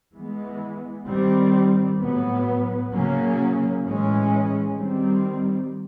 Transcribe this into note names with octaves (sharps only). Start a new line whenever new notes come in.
E3 G#3 B3
D#3 G3 C4
A2 F#3 B3
C#3 F#3 A#3 C#4
A2 E3 G#3 C#4
D#3 G3 C4